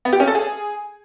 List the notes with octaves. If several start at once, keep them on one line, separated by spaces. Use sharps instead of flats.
B3
G4
C#4
A4
G#4